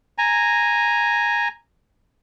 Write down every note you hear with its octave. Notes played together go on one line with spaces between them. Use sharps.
G#5 A#5